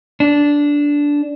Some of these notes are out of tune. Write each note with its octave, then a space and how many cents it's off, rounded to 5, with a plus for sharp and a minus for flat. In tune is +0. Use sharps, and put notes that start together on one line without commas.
D4 -10